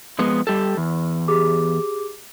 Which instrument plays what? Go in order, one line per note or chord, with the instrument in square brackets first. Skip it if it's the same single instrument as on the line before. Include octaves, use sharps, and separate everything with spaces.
[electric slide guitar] F2 G#3 B3
G3 G4 A4
E2
[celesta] G4 G#4 D6